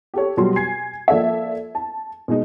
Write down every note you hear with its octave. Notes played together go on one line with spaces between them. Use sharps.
G4 A4 C#5
B2 F#3 G3 F#4 C6
G#5 G#6 C7
F3 A#3 A4 D5 E5
A5
B2 G#3 D#4